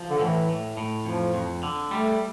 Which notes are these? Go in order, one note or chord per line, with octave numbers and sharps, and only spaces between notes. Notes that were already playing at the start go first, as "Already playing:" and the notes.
Already playing: F3
D3
A2 E3
A2
A2
F2 F3
F2
D3
G3 A3